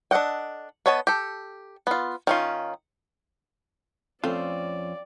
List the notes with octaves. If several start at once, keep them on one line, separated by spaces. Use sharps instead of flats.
D4 A4 D#5 F#5 G5
B3 C#5 D#5 A5
G4 A4
B3 F4
D#3 C#4 F4
F2 A3 C4 C#4 F4 D5